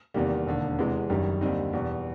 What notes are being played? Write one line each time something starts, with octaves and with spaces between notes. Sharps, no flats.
E2 C3 D#3 G3 A#3
E1 D#2 D3
E2 C3 E3 G#3
F#1 F#2 D#3 G3
D#2 D3 G3 C4 D#4
E2 B2 G3